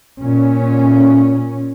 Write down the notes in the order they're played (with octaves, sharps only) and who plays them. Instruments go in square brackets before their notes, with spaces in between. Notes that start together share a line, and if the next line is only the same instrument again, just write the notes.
[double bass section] A#2 C#4